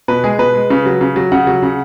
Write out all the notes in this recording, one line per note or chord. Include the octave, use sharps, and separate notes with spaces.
B2 B4
G#3 G#4
B2 B4
G#3
C#3
F#3
C#3
F#3
C#3 F#5
F#3
C#3